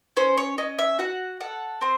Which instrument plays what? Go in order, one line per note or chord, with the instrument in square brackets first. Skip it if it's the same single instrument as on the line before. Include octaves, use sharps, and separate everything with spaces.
[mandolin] C#4 C5
C#5
C#4 D#5
E5
F#4 F#5
A4 F#5
C4 C5